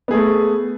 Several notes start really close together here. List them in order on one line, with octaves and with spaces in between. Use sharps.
B3 G#4 A3